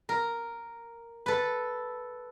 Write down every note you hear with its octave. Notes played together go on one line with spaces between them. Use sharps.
A#4
A4 B4